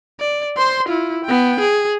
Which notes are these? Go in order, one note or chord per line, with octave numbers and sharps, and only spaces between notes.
D5
C5 C6
E4 F4
B3 G5
G#4